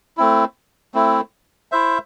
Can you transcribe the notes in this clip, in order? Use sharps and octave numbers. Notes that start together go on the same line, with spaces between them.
A3 C4 E4
A3 C4 E4
E4 C5 E5